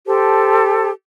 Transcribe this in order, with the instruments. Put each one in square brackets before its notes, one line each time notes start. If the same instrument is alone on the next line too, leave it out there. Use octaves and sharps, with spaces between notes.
[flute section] G4 A4 C5 A5